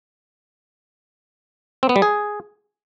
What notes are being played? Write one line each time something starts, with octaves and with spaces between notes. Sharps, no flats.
C4
B3
G3
G#4